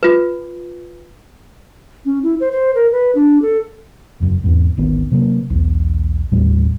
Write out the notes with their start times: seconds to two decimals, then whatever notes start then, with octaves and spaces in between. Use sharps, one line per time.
0.03 F4 B4
2.05 C#4
2.23 E4
2.40 C5
2.52 C5
2.75 A#4
2.92 B4
3.15 D4
3.42 A4
4.20 E1 C#2 F#2
4.44 E2 G#2
4.77 D1 G#1 D#3 B3
5.12 C3 F#3 G#3 A#3
5.50 B1 E2
6.32 G1 D#2 A2 G3